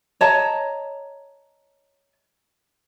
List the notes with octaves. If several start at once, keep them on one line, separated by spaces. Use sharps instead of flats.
C#5 D#5 A5 A#5